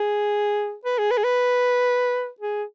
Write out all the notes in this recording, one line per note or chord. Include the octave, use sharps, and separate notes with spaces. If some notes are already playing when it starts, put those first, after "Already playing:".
Already playing: G#4
B4
G#4
B4
G#4
B4
G#4